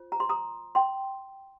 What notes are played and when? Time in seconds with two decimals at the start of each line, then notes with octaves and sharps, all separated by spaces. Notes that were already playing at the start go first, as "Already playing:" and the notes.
Already playing: F4 C5
0.12 A#5
0.20 C6
0.29 A#5 D#6
0.75 G5 C6